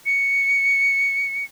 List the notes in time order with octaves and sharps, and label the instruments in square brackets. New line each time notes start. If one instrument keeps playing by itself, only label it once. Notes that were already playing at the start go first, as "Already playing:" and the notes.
[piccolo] C#7